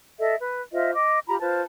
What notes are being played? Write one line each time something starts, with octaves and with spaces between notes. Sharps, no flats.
A4 D#5 E5
B4
F4 C5 D#5 E5
D#5 D6
F4 G4 A#5 B5
F4 B4 C5 A5